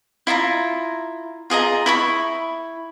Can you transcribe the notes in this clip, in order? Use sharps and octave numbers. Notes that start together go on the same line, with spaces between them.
E4 F4 D#5 A#5
F4 G#4 D#5 A#5
E4 B5 C#6